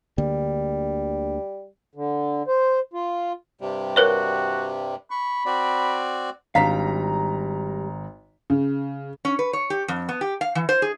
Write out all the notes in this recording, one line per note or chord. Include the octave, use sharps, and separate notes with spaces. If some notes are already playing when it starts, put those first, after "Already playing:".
D2 D3 G3 A#3
D3
C5
F4
G2 C3 G3
F#4 A#4 B4 C#5
B5 C#6
C4 F#4 D5
G#1 G3 D4 F5 A#5 B6
C#3
C#4
B4
C#5
G4
F2
B3
G4
F5
E3
C5
G#4